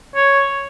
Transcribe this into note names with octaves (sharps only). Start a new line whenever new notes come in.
C#5